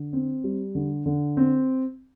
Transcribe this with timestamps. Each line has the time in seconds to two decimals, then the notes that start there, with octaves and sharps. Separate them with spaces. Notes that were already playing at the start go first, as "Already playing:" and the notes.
Already playing: D3
0.13 C4
0.44 G3
0.75 D3
1.06 D3
1.37 C4